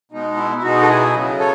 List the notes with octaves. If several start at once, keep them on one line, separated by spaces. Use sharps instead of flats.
B2 G#3 B3 D#4
E4
E4
B2 G#3 B3 D#4 F#4
A4
E4 G#4
C#3 F#3 B3
A4 C#5